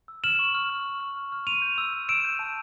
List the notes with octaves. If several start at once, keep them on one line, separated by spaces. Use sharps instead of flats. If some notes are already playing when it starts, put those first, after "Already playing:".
E6
F6 E7 F#7
C#6
F6
F6
C#6
F6
C#6
F6
C6 D#7 F7
G6
E6
E6
E6 D7 E7
G6
A5